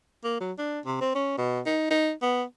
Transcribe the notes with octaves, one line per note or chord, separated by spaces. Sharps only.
A#3
F#3
D4
C3
C4
C#4
B2
D#4
D#4
B3